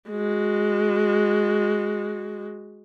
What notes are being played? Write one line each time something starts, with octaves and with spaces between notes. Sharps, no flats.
G#3 F#4